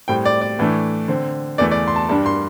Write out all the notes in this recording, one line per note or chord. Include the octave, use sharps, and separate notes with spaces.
A2 G3 C4 G5
D5
D5
A2 E3 A3 D4
D3 C4
E2 E3 A3 D5
D5
C6
A5
G2 G3 D4 A5
C6